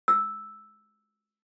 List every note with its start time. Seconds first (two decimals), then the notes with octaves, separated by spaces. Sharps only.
0.08 E6